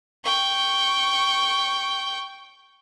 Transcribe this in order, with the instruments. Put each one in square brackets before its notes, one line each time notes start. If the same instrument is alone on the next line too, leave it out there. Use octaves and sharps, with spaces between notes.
[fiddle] G5 C#6